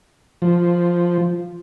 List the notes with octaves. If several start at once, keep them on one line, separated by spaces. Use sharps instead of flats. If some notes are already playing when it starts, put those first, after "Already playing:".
F3